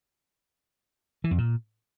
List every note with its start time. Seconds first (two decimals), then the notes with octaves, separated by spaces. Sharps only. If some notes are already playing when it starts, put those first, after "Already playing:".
1.24 E3
1.31 F2
1.38 A#2